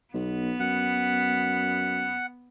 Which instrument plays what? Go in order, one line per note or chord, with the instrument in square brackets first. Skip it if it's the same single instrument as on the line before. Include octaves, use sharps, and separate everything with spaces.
[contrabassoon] B1 [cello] B3
[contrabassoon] F#2 [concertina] F#5